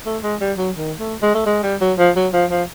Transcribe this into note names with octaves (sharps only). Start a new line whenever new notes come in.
A3
G#3
G3
F#3
D#3
A3
G#3
A3
G#3
G3
F#3
F3
F#3
F3
F3